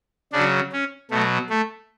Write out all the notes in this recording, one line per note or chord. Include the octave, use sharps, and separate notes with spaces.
C#3 F#3 D4
C#4
B2 F#3 A3
A3